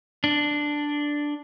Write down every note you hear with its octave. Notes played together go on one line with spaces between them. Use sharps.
D4